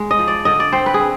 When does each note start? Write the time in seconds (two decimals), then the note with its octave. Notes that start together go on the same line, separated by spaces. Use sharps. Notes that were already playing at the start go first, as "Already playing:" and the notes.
Already playing: G#3
0.11 D#5
0.19 F3
0.28 D5
0.45 D3 D#5
0.60 D5
0.72 C4 C5
0.86 B4
0.94 G#4
1.00 C4